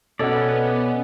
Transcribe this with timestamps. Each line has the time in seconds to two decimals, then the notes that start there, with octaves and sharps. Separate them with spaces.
0.19 B2 B3 C#4 A4 D5 D#5 F#5